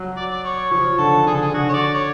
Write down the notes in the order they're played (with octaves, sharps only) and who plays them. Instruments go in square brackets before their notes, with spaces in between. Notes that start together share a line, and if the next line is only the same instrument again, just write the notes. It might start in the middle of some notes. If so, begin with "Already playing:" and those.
Already playing: [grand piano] F#3
[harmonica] D5
D5
C#5
[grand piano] F3 [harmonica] C#5
[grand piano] D3 [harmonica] A4
[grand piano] D3 [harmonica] G#4
[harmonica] A4
G#4
[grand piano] D3 [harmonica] F#4
[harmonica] C#5
D5
C#5